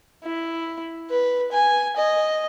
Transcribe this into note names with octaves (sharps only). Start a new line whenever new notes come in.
E4
B4
G#5
D#5